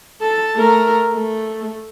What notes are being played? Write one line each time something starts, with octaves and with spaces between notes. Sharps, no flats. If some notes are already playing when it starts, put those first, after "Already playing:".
A4 A5
A3 A#4
A3